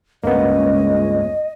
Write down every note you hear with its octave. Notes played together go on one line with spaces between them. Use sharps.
C#2 G2 A#3 B3 C#4 D#5